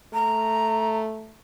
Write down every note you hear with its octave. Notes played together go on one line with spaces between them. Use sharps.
A3 A#5